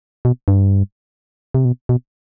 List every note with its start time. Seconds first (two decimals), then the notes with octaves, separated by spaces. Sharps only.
0.25 B2
0.48 G2
1.55 C3
1.65 B2
1.89 B2